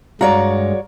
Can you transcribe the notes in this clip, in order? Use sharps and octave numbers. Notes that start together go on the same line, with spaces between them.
G2 G#3 F#4 C#5 D5 F5 A#5